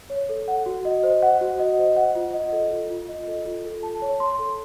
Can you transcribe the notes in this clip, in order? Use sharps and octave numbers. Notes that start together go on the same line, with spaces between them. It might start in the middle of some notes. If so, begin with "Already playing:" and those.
C#5
A4
F#5
F#4
D#5
C5
F#5
F#4
D#5
C5
F#5
F4
D#5
A4
F4
F4
D#5
A4
F4
A4
A5
C#5
C6
A4